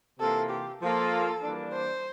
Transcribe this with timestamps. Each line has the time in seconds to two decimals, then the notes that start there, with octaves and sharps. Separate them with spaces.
0.19 C3 E3 A#3 F4 A4
0.50 G4
0.81 F3 A#3 F4 A4
1.43 E3 G3 A#3 D4
1.74 C5